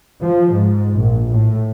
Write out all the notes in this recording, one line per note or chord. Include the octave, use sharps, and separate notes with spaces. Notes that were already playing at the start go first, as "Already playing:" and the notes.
F3
G#2
A#1
A2